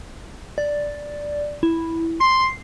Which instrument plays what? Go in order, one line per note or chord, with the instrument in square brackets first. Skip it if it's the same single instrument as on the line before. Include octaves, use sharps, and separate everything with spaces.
[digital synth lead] D5
E4
[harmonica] C6 [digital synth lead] C7